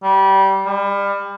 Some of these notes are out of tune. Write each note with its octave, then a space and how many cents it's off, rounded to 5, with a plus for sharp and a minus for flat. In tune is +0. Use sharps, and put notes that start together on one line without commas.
G3 -15
G3 +30